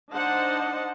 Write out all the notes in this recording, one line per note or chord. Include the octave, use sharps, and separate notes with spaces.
D4 D#4 C5 D#5 F#5 A5